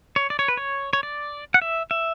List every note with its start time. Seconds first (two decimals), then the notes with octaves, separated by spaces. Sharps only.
0.16 C#5
0.30 D5
0.39 C#5
0.48 B4
0.57 C#5
0.93 C#5
1.03 D5
1.54 F#5
1.62 E5
1.91 E5